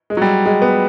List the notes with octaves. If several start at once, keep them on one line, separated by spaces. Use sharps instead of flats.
G#3
F#3
G3
G#3
B3